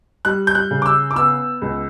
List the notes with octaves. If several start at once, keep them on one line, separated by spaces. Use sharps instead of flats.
G3 F#6
G6
F#6
C#3
D6
E6
D6
B3 E6
C#2